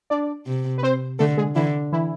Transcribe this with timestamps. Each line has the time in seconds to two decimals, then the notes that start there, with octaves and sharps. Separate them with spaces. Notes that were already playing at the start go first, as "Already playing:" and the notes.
0.10 D4 D5
0.46 C3
0.78 B4
0.83 C4 C5
1.19 D3 A3 A4
1.37 G#3 G#4
1.55 D3 E3 E4
1.92 E3 E4